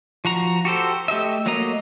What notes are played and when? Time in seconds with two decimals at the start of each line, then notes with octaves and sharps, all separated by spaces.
0.25 F3 F#4 A#5
0.65 F#4 G4 A4 C5
1.08 A3 G4 D#5 E5
1.46 F#3 A3 A#3 D#5 A#5